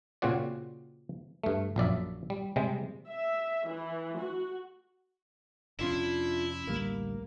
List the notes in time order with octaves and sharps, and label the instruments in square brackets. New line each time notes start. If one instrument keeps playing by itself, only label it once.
[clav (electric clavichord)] A#2 C#3 C4 F#4 D5
G2 A3
A#1 F#2 D5 E5
G3
C3 G3 G#3
[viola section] E5
E3
F#4
[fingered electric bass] F1 C#4 [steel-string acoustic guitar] D4 F4 [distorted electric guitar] E4
[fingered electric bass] A1 D2 G3 [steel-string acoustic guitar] A#3